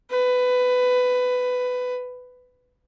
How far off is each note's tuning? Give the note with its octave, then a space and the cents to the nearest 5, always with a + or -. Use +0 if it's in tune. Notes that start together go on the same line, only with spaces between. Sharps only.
B4 +15